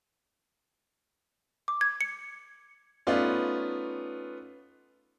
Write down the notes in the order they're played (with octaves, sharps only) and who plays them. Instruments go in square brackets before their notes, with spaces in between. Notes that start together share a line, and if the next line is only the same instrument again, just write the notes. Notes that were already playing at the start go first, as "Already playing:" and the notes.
[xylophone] D6
G#6
C#7
[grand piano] A3 B3 C#4 D#4 F4 D5